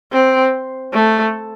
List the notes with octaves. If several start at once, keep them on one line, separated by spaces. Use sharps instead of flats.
C4
A3